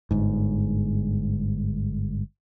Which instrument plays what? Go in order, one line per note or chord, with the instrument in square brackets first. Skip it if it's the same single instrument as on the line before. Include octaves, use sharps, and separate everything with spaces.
[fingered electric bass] G1 G#2